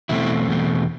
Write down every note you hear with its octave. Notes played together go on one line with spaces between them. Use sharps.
E2 B2 A3 C4 E4
E2 B2 A3 C4